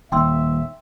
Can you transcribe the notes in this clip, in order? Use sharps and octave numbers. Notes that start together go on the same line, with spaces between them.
D#1 D#2 E5 G5 C6 E6